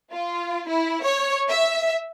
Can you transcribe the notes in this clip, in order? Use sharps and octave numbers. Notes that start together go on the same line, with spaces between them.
F4
E4
C#5
E5